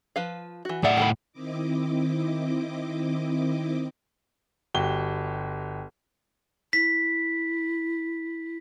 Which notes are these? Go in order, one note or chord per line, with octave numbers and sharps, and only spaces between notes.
F3 B4 F5
E3 F#4
A2 G#4 D5 E5 F#5
D#3 A4 B5
D#3 C4 E4 D#5 D6
G1 F#4 G4 G7
E4 B6